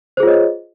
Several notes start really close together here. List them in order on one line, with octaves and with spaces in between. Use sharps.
C5 G#4 F4 C#5 D#5